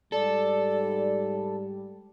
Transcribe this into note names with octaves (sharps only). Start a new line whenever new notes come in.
G#2 G3 A4 D5